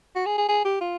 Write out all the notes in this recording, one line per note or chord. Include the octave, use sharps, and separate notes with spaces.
F#4
G#4
G#4
G#4
G4
F4